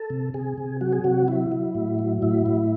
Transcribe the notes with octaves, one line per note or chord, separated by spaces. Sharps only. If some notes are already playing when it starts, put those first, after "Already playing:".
Already playing: A4
C3
C3 G#4
C3
F#3 F#4
G#4
C3 F#4
F#3 E4
F#3
A2
F#3
A2 E4
A2